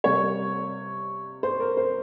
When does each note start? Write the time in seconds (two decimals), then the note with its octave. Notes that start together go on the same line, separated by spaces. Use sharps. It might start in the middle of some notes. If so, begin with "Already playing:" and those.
0.04 C3 G3 A#3 C#5
1.43 C5
1.60 A#4
1.77 C5